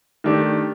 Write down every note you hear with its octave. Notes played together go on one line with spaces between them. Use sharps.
D#3 A3 D4 G4